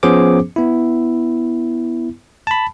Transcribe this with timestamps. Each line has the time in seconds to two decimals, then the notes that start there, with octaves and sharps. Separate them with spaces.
0.03 F3 B3 C#4 G#4 C5 D6
0.56 B3 E4
2.47 A5 B5